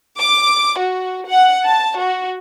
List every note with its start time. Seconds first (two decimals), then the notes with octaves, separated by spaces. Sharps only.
0.19 D6
0.78 F#4
1.27 F#5
1.66 A5
2.00 F#4